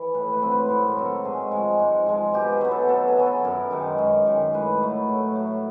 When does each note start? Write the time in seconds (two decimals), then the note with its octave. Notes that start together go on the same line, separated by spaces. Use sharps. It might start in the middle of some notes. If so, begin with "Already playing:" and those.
Already playing: E3
0.14 A2 B4
0.33 B4
0.42 F#3 A3 C4
0.51 B4
0.69 A2 C5
0.87 A#4
0.96 F#3 A3 C4
1.06 A4
1.24 G#2 G#4
1.52 F3 G#3
1.79 G#2
2.06 F3 G#3
2.34 B2 G4
2.52 G#4
2.61 F#3 B3
2.71 A4
2.89 B2 A4
3.08 G#4
3.16 F#3 B3
3.26 A4
3.45 F#2 A#4
3.71 D#3 G#3
3.98 F#2
4.26 D#3 G#3
4.54 A2 B4
4.81 F#3 A3
5.09 A2
5.36 F#3 A3